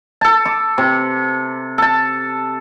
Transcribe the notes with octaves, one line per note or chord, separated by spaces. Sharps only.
A4 A5
D6
C3
A4 A5